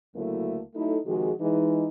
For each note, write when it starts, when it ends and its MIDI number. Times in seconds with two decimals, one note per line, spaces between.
0.15 0.60 38
0.15 0.60 49
0.15 0.60 54
0.15 0.60 57
0.15 0.60 58
0.15 0.60 64
0.75 0.97 54
0.75 0.97 57
0.75 0.97 63
0.75 0.97 64
0.75 0.97 69
1.06 1.32 48
1.06 1.32 51
1.06 1.32 53
1.06 1.32 56
1.06 1.32 66
1.06 1.32 68
1.40 1.87 52
1.40 1.87 56
1.40 1.87 63